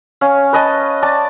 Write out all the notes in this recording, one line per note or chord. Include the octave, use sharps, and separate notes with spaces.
C#4 F5
B4 D#5 A5
D5 A5